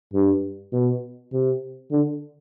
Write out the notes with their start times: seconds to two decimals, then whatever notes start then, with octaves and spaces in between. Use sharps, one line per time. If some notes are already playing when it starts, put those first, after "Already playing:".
0.13 G2
0.73 B2
1.33 C3
1.91 D3